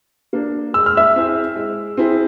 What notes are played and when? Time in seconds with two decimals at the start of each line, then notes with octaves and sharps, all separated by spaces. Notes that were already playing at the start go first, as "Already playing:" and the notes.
0.33 A#3 D4
0.74 G#3 E6
0.86 F6
0.97 E5 E6
1.16 C4 E4 G#4
1.56 G#3
1.97 C4 E4 G#4